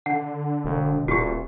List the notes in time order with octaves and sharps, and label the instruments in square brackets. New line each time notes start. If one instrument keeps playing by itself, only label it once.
[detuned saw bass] D3 [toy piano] F#5
[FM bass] E1
[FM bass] D#1 [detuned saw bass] A#2 [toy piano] F#4 G4